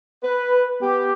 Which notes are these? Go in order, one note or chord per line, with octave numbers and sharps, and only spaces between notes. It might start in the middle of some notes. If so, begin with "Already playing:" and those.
B4
B3 G4